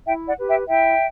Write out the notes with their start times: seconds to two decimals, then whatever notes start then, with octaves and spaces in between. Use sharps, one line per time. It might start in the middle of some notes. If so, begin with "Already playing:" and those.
0.06 E4 E5 G5
0.27 D5 F#5
0.38 G4 B4
0.48 E5 G5
0.69 E4 E5 G5